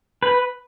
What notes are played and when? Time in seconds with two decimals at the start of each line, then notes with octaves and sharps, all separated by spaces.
0.23 B4